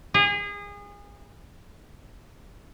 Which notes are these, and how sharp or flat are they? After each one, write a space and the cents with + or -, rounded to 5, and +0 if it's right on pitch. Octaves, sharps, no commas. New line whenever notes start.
G#4 -30